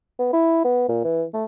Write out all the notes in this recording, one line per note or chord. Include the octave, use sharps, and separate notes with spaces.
B3
E4
B3
A#2
E3
A3